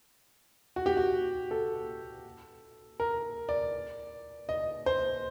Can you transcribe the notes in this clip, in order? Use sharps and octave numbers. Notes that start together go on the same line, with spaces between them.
F#4
G4
F#4
A4
A#4
D5
D#5
C5